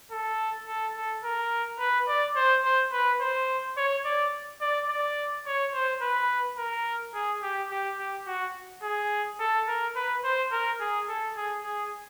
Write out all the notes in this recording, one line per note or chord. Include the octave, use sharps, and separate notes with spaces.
A4
A4
A4
A#4
B4
D5
C5
C5
B4
C5
C#5
D5
D5
D5
C#5
C5
B4
A#4
G#4
G4
G4
G4
F#4
G#4
A4
A#4
B4
C5
A#4
G#4
A4
G#4
G#4